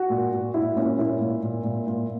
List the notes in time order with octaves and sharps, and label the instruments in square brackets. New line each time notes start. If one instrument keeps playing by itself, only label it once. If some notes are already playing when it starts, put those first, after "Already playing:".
Already playing: [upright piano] F#4
A#2
A#2
A#2 E4
A#2 C#4
A#2 E4
A#2
A#2
A#2
A#2